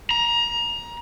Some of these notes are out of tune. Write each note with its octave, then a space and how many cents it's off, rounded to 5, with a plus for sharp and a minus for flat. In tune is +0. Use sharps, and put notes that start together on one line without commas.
A#5 +25